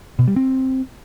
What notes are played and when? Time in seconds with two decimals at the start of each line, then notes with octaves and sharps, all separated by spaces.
0.19 B2
0.28 G3
0.36 C4